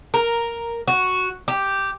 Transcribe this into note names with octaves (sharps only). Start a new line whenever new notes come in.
A#4
F#4
G4